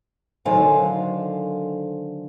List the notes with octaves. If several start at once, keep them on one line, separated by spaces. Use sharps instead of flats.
D3 D#3 F#3 C5 F5 G#5